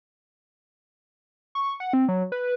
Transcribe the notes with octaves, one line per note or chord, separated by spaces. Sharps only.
C#6
F#5
C4
F#3
B4